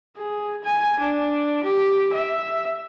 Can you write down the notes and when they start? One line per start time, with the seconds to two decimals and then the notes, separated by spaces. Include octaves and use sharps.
0.17 G#4
0.64 G#5
1.00 D4
1.64 G4
2.13 E5